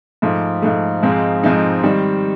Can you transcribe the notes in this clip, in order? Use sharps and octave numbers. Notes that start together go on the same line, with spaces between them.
G#2 F3 A3
G#2 F3 A3
G#2 F3 G#3 C4 D#4
G#2 F3 G#3 C4 D#4
D#3 G3 C4